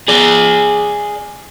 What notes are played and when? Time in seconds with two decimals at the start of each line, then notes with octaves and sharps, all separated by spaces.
0.08 G#4 D5